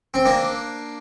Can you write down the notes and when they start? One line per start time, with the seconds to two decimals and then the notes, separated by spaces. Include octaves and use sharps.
0.14 C4
0.25 A#3 D4